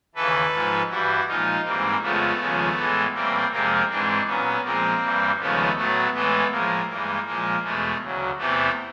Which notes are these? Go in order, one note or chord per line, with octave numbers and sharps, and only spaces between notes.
D#2 C#3 E3 A4 B4
G#2 F3 G#3
G2 E3 G3 E4 F#4
A#2 F3 G#3 D#4 F4
G#2 E3 G3 A#3 C4
F2 C#3 F3 G#3 A3 B3
D#2 C#3 F3 G#3
A2 E3 G#3
A2 E3 G3 A#3 C4
F2 C3 F3 G#3 A#3 C4
G#2 E3 G#3 C4 D4
A#2 F#3 B3 C#4
A#2 F3 G#3 A#3 C4
G2 E3 G3
D#2 C#3 F3 G#3 A3 B3
A2 F#3 A3 B3
A2 E3 G#3 A3 B3
A2 F3 G#3 A#3
G2 E3 G#3 A#3
A#2 F3 G#3 A#3
E2 B2 G#3 A3
D2 C#3 F#3
E2 C3 E3 A3 B3